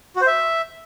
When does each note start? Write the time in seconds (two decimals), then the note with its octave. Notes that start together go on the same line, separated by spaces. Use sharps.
0.16 F#4
0.21 C5
0.27 E5